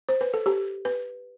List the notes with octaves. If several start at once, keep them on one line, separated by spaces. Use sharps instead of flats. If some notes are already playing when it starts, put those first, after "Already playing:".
C5
B4
A4
G4
B4